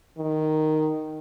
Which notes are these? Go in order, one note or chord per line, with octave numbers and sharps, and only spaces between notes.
D#3